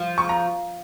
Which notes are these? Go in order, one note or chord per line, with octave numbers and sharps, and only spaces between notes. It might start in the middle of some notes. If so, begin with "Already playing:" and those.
Already playing: F3
C#6
A#5